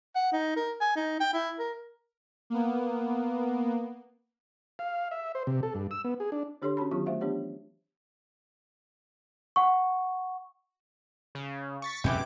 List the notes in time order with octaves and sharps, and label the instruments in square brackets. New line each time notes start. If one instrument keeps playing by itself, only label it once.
[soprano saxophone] F#5
D#4
A#4
G#5
D#4
G5
E4
A#4
[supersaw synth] A#3 B3
[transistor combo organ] F5
E5
C5
C3
A4
G2
E6
B3
G#4
D4
[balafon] D3 D4 G4 A4 C#5 C6
C#4 F#4 A5 B5
D#3 F#3 B3 F4 G4 C#6
A3 C5 E5 F5
E3 B3 D4 G4 C#5 F#5
[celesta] F#5 C#6
[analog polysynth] C#3
C#6 A6 B6
[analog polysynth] B1 D6 [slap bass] F#2 C3 C#4 [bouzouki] E3 G4